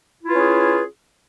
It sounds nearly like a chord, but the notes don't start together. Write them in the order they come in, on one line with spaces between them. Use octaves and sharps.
E4 F4 B4 C#4 G#4